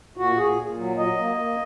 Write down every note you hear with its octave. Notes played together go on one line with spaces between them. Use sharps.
A#2 F#4
A#2 G#4
A#2
F#3
F#3 D#5
A#3
A#3